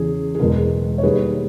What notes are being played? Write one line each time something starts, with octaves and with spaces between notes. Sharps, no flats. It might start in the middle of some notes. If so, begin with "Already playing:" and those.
Already playing: E2 C#3 E3 G#4
G#4
E1 E2 B2 G#3 B3 A#4
C#5
D#2 D#3 G3 G#4 B4